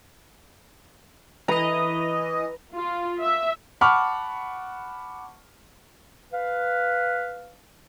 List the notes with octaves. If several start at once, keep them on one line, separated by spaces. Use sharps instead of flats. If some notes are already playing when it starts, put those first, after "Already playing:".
E3 B4 D#5 A#5
F4
E5
F#5 A5 B5 C#6 D6 F6
B4 F5